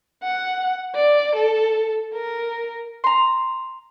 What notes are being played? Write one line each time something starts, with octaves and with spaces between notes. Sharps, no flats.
F#5
D5
A4
A#4
A#5 C6